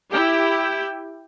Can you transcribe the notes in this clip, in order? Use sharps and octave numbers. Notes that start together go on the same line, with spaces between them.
E4 G4 G5